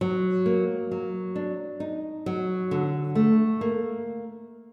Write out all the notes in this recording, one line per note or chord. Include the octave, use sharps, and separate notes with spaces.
F#3
A#3
F#3
D4
D#4
F#3
D3
A3
A#3